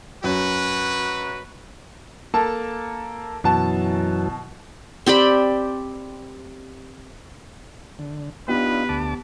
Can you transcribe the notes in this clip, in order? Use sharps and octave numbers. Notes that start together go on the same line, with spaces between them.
F#2 F#4 B4
A#3 A4 A5
F#2 B2 E3 F#3 A5
C4 G4 D5 B5
D3
B3 D4 D#4 F4 G4 B4
D2 A5 D6